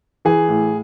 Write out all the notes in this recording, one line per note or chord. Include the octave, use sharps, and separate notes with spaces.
E3 G#4
A2